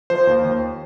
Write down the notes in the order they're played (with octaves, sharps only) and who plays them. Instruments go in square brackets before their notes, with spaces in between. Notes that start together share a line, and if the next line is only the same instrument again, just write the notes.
[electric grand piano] F3 C5
D#2
D#2